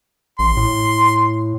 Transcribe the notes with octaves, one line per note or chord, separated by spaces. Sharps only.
A1 C6
A2